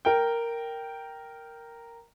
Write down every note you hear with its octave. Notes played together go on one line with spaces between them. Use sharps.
A#4 G5